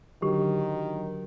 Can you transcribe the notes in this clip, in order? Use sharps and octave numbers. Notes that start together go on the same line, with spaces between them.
D3 D#3 F#3 G4